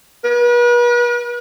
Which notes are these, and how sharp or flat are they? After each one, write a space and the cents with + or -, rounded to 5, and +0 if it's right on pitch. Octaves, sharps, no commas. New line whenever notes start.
B4 -40